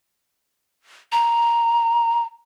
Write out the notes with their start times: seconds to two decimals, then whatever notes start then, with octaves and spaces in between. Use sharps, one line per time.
1.12 A#5